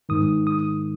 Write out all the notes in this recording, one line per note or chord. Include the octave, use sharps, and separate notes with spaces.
G#2 D#3 D#6
D#6